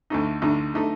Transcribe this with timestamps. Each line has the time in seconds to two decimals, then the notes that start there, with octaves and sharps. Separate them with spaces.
0.10 D2 D3 A3 D#4
0.42 D2 D3 A3 D#4
0.74 D3 A3 D#4